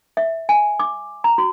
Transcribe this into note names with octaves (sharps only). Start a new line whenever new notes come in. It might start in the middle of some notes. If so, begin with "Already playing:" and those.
E5
G#5
D6
A#5
F#4